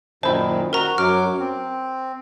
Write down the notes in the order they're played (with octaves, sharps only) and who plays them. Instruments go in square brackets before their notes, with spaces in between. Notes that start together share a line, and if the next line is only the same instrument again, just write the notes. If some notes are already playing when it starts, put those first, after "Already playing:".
[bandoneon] F#2 A#2 D#3 [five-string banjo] E4 A5 [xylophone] C5
[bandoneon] F#4 [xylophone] A#4 A#5
[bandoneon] F#2 F#3 D6 [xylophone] F6
[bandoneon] C4